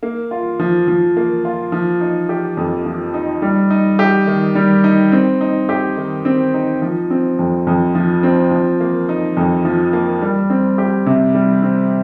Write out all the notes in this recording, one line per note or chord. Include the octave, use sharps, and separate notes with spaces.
A#3
F4
F3
F3
A#3
F4
F3
D#4
G4
F2
F3
D#4
G3
D#4
G4
D#3
G3
D#4
C4
D#4
G4
D#3
C4
D#4
F3
C4
F2
F2
F3
C4
F3
A#3
D#4
F2
F3
A#3
G3
C4
G4
C3
G3
C4